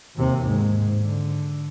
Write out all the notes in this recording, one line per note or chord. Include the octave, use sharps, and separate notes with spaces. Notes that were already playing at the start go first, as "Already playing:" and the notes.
D#2 C3
G#2
D3